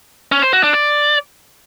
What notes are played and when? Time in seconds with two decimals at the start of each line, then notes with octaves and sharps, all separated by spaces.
0.32 C#4
0.42 C5
0.53 F#4
0.63 D4
0.74 D5